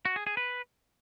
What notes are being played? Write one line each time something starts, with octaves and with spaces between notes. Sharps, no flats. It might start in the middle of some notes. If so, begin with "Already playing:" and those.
F#4
G#4
G#4
B4